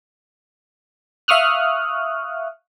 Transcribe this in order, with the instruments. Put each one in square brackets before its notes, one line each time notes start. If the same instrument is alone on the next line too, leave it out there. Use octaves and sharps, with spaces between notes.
[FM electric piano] E5 F5 C#6 D#6 F6 F#6